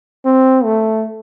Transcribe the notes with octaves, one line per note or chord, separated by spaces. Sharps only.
C4
A3